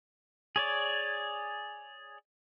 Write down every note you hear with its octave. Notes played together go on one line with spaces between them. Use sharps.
G#4 C#5 D5